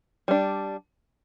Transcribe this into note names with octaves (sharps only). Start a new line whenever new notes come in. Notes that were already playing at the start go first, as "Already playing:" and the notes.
G3 D4